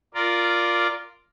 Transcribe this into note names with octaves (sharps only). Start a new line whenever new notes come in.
F4 A#4 D5